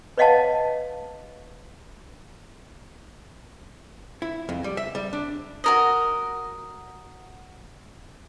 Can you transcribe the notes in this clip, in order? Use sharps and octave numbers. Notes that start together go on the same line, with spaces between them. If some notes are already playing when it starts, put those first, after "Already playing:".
B4 C#5 D#5 F5 F#5 A5
E4
F2
G3
E5
G3
D4
F#4 A#4 D#5